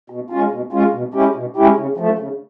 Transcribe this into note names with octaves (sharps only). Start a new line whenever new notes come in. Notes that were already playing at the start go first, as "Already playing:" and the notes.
B2
G#3 C#4 F4
B2
G#3 C#4 F4
B2
G#3 C#4 E4 G4
B2
G#3 C#4 E4 G4
C#3
F3 A3
C#3